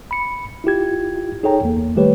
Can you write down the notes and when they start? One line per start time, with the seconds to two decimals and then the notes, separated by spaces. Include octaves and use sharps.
0.11 B5 C#7
0.64 E4 F4 G4 G#6
1.43 D#4 G#4 A4 C#5 G5 A#5
1.62 E2 A#3
1.96 D#3 G3 A3 G4 B4 C#5